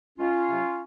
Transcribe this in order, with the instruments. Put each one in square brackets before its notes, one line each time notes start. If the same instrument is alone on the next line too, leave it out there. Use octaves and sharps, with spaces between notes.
[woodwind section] C#2 C#4 F4
C3 F#3